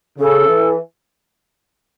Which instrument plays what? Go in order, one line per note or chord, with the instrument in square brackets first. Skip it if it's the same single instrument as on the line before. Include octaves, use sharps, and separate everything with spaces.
[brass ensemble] C#3 [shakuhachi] A4
[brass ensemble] E3